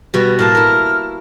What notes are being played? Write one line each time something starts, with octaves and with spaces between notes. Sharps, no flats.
B2 G3 F#4 B4
A2 A#3 A5 F6
E4 A#4